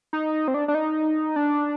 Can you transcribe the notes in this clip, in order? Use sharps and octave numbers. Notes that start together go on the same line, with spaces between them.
D#4
C4
D4
D4
D#4
D4